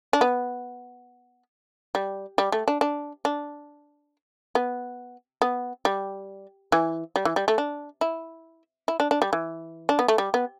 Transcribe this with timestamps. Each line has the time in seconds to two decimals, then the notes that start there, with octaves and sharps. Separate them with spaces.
0.13 D4
0.21 B3
1.95 G3
2.38 G3
2.52 A3
2.68 D4
2.81 D4
3.25 D4
4.55 B3
5.42 B3
5.85 G3
6.72 E3
7.16 G3
7.25 E3
7.36 G3
7.48 A3
7.58 D4
8.01 E4
8.88 E4
9.00 D4
9.11 D4
9.22 G3
9.33 E3
9.89 D4
9.99 B3
10.08 A3
10.18 G3
10.34 B3